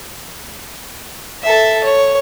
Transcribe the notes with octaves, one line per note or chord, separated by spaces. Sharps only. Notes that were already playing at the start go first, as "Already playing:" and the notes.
A4 E5
C#5